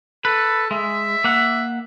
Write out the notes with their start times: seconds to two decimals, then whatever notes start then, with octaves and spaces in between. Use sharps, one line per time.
0.25 A4 B4
0.71 G#3 E5
1.24 A#3 F#5